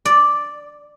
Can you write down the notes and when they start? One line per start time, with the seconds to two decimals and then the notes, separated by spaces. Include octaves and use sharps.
0.05 D5